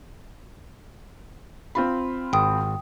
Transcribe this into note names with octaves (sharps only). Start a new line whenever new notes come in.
C4 F4 B5
G#1 G5 D#6